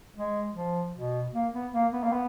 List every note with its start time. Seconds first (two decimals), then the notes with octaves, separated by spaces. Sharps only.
0.15 G#3
0.54 F3
0.94 B2
1.33 A#3
1.53 B3
1.73 A#3
1.93 B3
2.03 A#3
2.12 B3